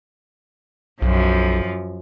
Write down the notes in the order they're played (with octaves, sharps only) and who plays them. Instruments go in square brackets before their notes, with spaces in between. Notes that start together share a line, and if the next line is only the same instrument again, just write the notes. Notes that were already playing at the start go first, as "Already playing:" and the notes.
[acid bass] B1 [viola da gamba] F#2 F3